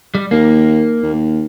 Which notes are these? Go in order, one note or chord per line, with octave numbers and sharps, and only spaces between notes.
G3
D#2 A#3
D#2